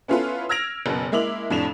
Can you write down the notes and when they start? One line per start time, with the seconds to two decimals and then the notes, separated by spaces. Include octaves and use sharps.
0.08 B3 C#4 E4 F4 A4 B4
0.49 E6 F6 G#6 A#6 D7 F7
0.86 F#1 B2
1.12 G#3 A#3 E4 D6 F7 F#7
1.50 F1 F2 A2 D4 E7 F7